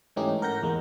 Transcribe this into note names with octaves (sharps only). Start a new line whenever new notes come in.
G#2 E3 A3 C#4 D#4 G4
A#4 F#5 G6 A#6
E2 G#3 A#3